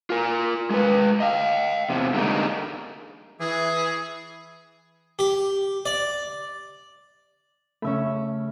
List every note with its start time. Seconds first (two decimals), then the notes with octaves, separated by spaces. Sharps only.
0.10 F4 A#4
0.70 G#3 B4
1.20 D#5 F5
1.90 E2 C3
2.14 D3 G3 G#3 A#3 D#4
3.40 E3 G#4
5.19 G4
5.86 D5
7.82 C#3 A3 C#4 E5 B5